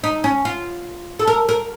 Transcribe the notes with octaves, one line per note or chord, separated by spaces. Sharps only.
D#4
C#4
F4
A4
A#4
A#4